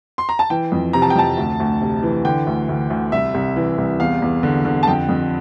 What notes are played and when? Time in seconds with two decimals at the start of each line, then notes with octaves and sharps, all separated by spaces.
0.18 C6
0.29 A#5
0.39 A5
0.50 E3 G5
0.72 F2
0.93 C3 A#5
1.02 A5
1.10 G5
1.16 F2 A5
1.38 D2
1.60 D2
1.81 C3
2.03 E3
2.25 D3 G5
2.47 D2
2.69 D2
2.90 D2
3.12 C2 E5
3.34 C2
3.56 E3
3.78 C2
4.00 E2 F5
4.22 E2
4.43 D3
4.65 D3
4.83 A5
4.87 F2 G5
5.09 F2